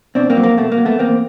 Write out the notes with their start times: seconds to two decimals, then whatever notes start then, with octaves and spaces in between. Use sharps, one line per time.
0.15 B2 C4 D4
0.30 A#3 C4
0.37 F#3
0.43 A#3
0.57 B2 A3
0.72 A#3
0.78 F#3
0.85 A3 B3
0.99 E2 A#3 C4